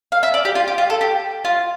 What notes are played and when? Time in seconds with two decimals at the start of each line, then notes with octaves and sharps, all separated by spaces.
0.12 F5
0.23 E5
0.34 D5
0.45 G4
0.55 F4
0.68 G4
0.78 F4
0.90 A4
1.01 G4
1.45 F4